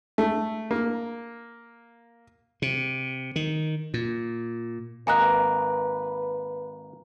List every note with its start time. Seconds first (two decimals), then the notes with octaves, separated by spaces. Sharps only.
0.18 A3
0.71 A#3
2.62 C3
3.36 D#3
3.94 A#2
5.07 G#1 A#3 B4 D#5 G#5 A#5 F#6